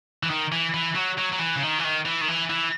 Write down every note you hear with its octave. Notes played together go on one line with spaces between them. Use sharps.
E3
D#3
E3
E3
F#3
F#3
F#3
E3
C#3
D#3
E3
D#3
E3
D#3
E3
E3